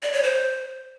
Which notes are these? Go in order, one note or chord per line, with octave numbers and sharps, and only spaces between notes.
D5
C#5
C5